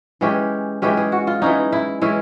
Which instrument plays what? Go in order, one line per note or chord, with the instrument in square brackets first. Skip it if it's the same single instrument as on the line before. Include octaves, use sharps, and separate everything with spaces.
[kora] E3 G#3 C#4 G4
E3 G#3 C#4 G4
G#4
F#4
F4
E3 G#3 C#4 D#4
E4
E3 G#3 C#4 E4